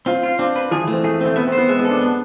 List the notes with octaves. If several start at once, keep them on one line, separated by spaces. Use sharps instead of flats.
C4 F4
F4
C4 D4
B4
F3 G#4
E3
A3
C4
A3 G#4
A3 C4
B3 E5
C4
C5
B3
G#3 E5
B3
A4
D4
B3